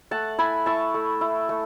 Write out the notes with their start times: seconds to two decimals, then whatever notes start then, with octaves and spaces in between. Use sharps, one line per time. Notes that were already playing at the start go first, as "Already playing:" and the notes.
0.11 A3 F#5 A5
0.38 E4 G#5 B5
0.66 E4 A5 C#6
0.94 A3
1.21 E4
1.49 A3